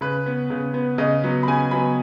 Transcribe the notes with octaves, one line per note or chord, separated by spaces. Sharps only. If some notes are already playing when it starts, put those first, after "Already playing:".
C#3 B4
B3
C#3
B3
C#3 D#5
F#3 B3
B5
C#3 G#5
F#3 B3 B5